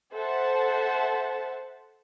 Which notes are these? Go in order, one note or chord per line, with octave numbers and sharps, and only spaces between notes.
A4 C5 E5 F#5 A5